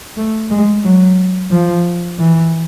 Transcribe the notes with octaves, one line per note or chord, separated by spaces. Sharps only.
A3
G#3
F#3
F3
E3